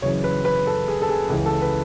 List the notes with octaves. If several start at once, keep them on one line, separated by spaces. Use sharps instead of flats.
F#1 F#2 C#3 E3 C#5
B4
B4
A4
G#4
A4
G#4
C#2 C#3 E3 G#4
A4
B4